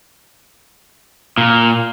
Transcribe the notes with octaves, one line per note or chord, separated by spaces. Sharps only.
A#2